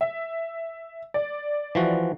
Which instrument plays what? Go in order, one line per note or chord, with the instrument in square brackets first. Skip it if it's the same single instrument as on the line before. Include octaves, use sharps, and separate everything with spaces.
[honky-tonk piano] E5
D5
[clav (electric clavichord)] E3 F3 F#4